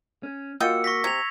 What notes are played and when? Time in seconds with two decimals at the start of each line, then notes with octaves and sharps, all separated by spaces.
0.23 C#4
0.60 A#3 F4 F#4 D#5 G5 E6 C#7
0.84 C#6 A#6 B6
1.04 C3 G#6 F7